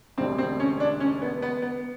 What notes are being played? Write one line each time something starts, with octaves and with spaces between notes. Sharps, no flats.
E1 D2 D3 G3 C4
C4
C#4
D4
C#4
B3
B3
B3